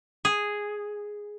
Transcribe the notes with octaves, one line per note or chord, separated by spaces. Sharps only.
G#4